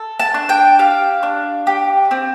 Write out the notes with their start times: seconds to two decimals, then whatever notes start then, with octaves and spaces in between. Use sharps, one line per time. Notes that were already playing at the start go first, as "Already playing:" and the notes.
Already playing: A4
0.20 A5
0.34 D4
0.49 G5
0.79 G4 F5
1.23 D4
1.67 G4
2.11 C4